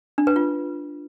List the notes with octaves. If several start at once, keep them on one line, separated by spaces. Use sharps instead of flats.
D4
B4
F4